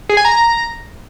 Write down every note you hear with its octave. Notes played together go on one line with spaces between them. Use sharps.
G#4
G#5
A#5